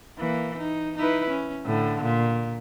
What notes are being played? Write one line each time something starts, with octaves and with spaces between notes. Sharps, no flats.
E3 A#3
D#4
D#4 E4 B4
C#4
A2 D3
A#2